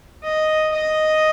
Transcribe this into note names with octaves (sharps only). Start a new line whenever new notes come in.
D#5
D#5